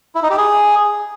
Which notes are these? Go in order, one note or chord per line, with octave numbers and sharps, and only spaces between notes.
E4
D#4
G4
G#4